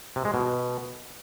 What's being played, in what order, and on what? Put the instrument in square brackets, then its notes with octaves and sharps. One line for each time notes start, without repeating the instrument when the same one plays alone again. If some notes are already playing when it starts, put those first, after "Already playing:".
[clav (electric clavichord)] C3
G#3
B2